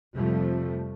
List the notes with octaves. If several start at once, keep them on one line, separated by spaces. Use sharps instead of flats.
F2 C3 F3 G3 A3